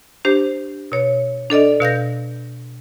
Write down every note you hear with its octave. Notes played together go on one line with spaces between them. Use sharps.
D4 G4 C5
B2 C#5
D4 A4 D5 D#5
B2 F5 G6 A#6